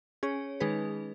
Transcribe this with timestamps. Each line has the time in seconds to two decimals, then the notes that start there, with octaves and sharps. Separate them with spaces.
0.23 C#4 G#4 C#5
0.60 D#3 G#3 D#4 G#4 B4